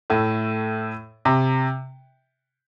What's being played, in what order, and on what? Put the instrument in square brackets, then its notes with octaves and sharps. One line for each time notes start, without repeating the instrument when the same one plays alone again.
[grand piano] A2 A3
C3